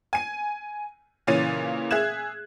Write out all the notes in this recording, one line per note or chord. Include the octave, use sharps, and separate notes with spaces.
G#5 D#7
A#2 C#3 E3 C#4 A6 D#7
G#4 E5 F#6 G#6 E7